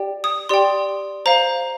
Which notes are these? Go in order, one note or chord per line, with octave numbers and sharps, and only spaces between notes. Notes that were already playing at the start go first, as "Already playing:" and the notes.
Already playing: G4 D5 G5
D#6
G4 D5 G5 C6
C5 F5 A#5